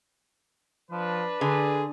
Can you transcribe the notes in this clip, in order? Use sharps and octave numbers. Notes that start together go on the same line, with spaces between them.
F3 D4 B4
D3 G#4